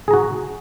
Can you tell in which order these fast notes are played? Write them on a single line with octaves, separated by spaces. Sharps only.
G#4 A#5 F#4